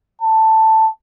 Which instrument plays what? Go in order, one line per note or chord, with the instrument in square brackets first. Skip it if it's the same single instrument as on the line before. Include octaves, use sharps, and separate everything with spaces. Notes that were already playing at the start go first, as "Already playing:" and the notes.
[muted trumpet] A5